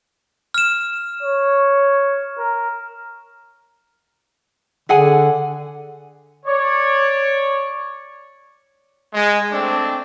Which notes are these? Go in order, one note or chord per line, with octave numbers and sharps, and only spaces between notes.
F6 E7
C#5
A#4
D3 G#4 F#5 G#5
C#5 D5
G#3
A3 C4 D4